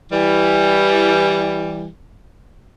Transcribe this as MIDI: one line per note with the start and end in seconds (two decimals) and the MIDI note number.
0.12 1.86 52
0.12 1.86 55